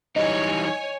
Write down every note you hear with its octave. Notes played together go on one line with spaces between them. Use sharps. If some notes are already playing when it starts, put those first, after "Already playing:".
E3 G3 D#4 C#5 D#5 G#5